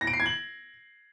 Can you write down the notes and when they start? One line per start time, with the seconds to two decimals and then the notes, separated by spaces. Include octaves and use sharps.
0.01 A#6
0.07 D7
0.13 C7
0.20 G#6
0.26 F#7